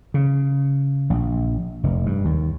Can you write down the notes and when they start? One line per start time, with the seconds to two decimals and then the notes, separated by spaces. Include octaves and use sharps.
0.14 C#3
1.10 A#1
1.83 F1
2.06 G2
2.25 D#2